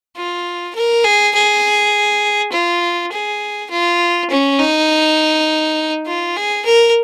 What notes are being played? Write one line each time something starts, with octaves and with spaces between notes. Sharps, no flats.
F4
A#4
G#4
G#4
F4
G#4
F4
C#4
D#4
F4
G#4
A#4